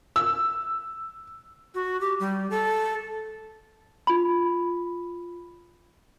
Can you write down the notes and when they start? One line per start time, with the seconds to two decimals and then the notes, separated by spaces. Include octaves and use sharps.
0.16 E6
1.75 F#4
2.01 G4
2.20 G3
2.51 A4
4.07 F4 B5